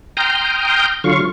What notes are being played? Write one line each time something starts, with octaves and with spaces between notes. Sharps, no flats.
G5 A#5 C6 D#6 F6 G6
D3 F#3 F4 F5 C#6